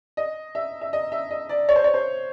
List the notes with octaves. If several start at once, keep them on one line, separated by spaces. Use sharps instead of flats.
D#5
E5
E5
D#5
E5
D#5
D5
C#5
C5
C#5
C5